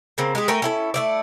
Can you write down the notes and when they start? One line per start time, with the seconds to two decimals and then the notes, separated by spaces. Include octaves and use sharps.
0.18 C#3 A#3 C4
0.35 G#3 G4 G#4
0.48 A3 A#4 G5 G#5
0.62 C#4 E4 A4
0.94 A3 E4 D5